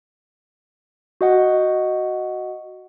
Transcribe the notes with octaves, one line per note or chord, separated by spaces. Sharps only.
F#4 D#5 F#5